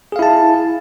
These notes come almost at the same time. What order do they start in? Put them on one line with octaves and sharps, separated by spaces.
G#4 F5 E4 A5